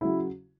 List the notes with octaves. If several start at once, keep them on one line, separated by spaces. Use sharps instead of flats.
C#3 F#3 E4